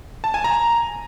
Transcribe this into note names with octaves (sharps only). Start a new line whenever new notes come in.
A5
G#5
A#5